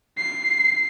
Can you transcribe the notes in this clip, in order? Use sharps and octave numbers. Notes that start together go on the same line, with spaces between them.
C7